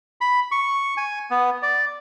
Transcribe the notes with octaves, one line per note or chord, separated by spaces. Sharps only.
B5
C#6
G#5
B3
D5